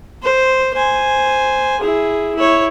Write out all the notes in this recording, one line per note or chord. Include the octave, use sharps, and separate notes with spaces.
C5
C5 G#5
E4 G#4
E4 C#5